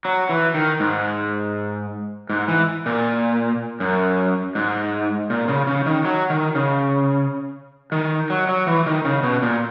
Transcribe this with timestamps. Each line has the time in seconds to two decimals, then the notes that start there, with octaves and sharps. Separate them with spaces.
0.05 F#3
0.29 E3
0.54 D#3
0.80 G#2
2.30 G#2
2.48 E3
2.86 A#2
3.80 F#2
4.55 G#2
5.30 A#2
5.48 C#3
5.67 C#3
5.86 D#3
6.05 F#3
6.30 D#3
6.55 C#3
7.92 D#3
8.30 F#3
8.49 F#3
8.67 E3
8.86 D#3
9.05 C#3
9.23 B2
9.42 A#2